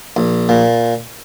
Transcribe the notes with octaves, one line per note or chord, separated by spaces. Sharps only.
A#1
A#2